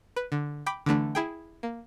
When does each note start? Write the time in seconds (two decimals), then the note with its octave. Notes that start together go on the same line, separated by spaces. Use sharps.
0.16 B4
0.32 D3
0.66 G5 B5 D6
0.86 D3 E3 A3 D4
1.15 E4 G#4 G5
1.63 A#3